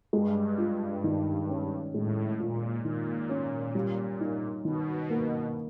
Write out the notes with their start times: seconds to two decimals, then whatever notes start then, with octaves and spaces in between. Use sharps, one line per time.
0.13 G2 G#3
0.58 F4
1.04 D#3
1.49 C#4
1.93 A2 G#3
2.39 A#2 F4
2.85 A#2 D#3
3.29 C#4
3.75 G3
4.20 D#4
4.65 B2 D#3
5.10 A#3